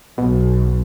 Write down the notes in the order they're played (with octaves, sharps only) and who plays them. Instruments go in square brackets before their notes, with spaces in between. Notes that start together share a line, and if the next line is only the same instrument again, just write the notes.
[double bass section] B1 [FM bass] B2